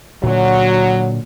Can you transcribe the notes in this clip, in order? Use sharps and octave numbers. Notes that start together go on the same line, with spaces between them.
A#2 D3 F#3